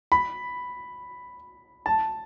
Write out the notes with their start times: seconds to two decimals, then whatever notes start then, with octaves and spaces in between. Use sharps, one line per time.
0.12 B5
1.86 A5